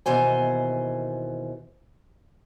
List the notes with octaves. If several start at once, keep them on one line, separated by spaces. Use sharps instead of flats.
D#2 B2 E3 C5 G#5